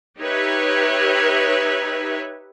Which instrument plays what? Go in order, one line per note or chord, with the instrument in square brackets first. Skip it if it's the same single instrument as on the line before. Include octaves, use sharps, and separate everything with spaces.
[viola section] D#4 G4 B4 C#5 E5